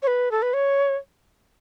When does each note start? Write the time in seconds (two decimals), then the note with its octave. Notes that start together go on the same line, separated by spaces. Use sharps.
0.03 C#5
0.07 B4
0.31 A4
0.42 B4
0.54 C#5